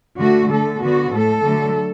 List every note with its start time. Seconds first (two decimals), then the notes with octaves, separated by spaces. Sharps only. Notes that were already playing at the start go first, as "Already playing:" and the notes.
0.18 D3 A3 F#4
0.49 D3 A3 A4
0.81 D3 B3 F#4
1.13 A2 A3 A4
1.44 D3 F#3 A3